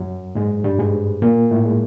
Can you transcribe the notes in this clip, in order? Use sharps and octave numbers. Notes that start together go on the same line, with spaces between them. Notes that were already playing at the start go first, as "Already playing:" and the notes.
Already playing: F#2 F#3
G#2 G#3
G2 G3
G#2 G#3
A#2 A#3
A2 A3
G#3